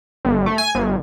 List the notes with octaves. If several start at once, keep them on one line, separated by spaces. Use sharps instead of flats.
G1
A3
G#5
G1